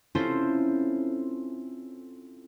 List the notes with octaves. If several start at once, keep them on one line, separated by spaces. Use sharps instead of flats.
C4 C#4 E4 F4 A4 C5